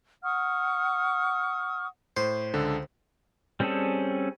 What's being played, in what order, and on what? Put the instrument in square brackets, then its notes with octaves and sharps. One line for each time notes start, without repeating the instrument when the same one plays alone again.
[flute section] F#5 C#6 D#6 F6
[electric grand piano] A2 [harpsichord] C5
[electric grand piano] C#2 D3 A4
[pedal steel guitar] G3 C4 C#4 G#4 A4